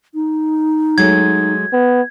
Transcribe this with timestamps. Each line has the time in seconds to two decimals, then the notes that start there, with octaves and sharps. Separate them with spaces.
0.14 D#4
0.98 F#3 G#3 A3 G#6
1.72 B3